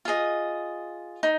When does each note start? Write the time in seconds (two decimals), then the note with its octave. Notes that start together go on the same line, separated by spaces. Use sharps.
0.05 F4 G#4 D#5
1.23 D#4